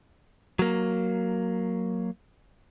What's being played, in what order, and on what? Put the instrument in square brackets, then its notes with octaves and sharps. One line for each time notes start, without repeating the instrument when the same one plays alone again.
[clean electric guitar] F#3 A#3